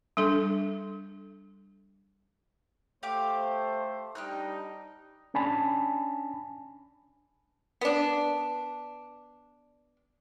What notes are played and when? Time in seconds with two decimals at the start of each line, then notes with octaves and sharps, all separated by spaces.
0.17 G3 D4 A4
3.03 A3 G4 C5 F5 D6
4.15 G3 D4 D#4 G5 F6 F#6
5.34 C#4 D4 G#5 A5 B5
7.81 B3 D4